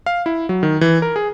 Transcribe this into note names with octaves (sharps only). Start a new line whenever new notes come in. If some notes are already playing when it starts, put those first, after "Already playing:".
F5
E4
F#3
D#3
E3
A#4
G#4